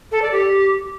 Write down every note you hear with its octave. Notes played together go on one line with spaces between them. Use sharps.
A4
D5
G4